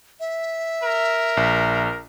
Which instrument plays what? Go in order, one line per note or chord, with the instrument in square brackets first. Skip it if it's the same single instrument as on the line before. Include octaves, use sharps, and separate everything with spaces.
[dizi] E5
[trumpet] A#4
[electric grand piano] A#1